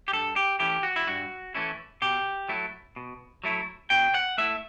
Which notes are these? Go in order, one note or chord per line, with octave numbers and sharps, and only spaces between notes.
G4
G2 A4
G4
E3 A3 C#4 E4 G4
F#4
E4
G2 F#4
E3 A3 C#4 E4
B2 G4
F#3 A3 E4
B2
F#3 A3 E4
B2 G5
F#5
A3 E4 E5